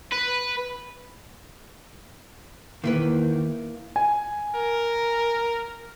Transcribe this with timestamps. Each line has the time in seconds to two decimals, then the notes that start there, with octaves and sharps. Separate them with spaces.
0.12 B4
2.84 E2 D#3 A#3 E4 B4
3.96 G#5
4.56 A#4